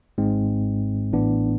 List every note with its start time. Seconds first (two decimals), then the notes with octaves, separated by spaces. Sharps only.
0.18 G#1 G#2 G#3 C4
1.13 A1 A2 E3 B3 D4